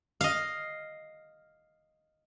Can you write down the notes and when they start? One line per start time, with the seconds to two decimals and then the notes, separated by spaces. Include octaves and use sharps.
0.21 D#5 F5